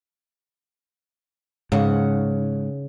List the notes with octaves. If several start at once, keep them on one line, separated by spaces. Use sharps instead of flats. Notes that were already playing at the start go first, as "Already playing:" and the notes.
G#2 C#3 F#5